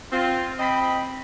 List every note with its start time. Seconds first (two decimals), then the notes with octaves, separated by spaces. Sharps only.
0.11 C4 F4
0.59 C4 D#5 G5 B5